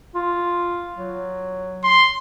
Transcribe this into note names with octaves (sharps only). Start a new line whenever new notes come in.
F4
F#3
C6